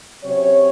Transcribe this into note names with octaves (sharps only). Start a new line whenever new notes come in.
C3 F#3 C#4 C#5